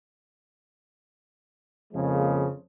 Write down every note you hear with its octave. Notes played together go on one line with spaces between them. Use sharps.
F2 C#3 F3 G#3 A#3